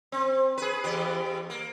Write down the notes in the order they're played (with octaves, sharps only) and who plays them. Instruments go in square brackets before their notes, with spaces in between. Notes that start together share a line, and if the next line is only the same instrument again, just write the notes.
[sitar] C4
G#4 B4
E2 G4
A#3